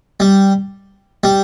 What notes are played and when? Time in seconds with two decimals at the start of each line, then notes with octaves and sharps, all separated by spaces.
0.20 G3
1.24 G3